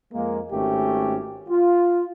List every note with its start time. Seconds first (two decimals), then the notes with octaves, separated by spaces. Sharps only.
0.14 F2 G#3 A#3
0.51 G#1 A3 C#4 G4
1.49 F4